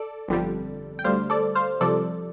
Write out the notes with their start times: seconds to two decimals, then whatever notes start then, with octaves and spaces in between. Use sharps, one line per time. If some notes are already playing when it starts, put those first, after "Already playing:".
Already playing: A4 D5
0.28 G1 F2 D3 G3
0.99 G5
1.04 D2 D3 G3 C5 F5
1.30 A4 D5
1.55 C5 F5
1.80 C2 C3 F3 A4 D5